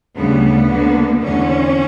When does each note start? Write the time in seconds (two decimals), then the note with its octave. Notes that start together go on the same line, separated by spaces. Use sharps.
0.16 D2 C#3 G3 B3
0.69 D2 D3 A#3
1.22 E2 D3 C#4